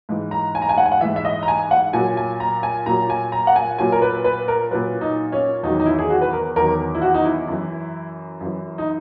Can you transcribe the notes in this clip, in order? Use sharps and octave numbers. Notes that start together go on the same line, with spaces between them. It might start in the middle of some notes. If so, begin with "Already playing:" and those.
G#2 E3
A#5
G#5
A#5
G#5
F#5
G#5
F#5
G#2 E3 E5
E5
D#5
A#5
G#5
F#5
A#2 F#3 G#5
G#5
A#5
G#5
A#2 F#3 A#5
G#5
A#5
F#5
G#5
A#2 F#3 G#5
A#4
B4
B4
A#4
A#2 F#3 B4
D#4
C#4
E2 D#3 F#3 D#4
D#4
E4
G#4
F#4
B4
A#4
E2 D#3 F#3 A#4
E4
F#4
D#4
E4
F#2 E3
F#2 E3
D#4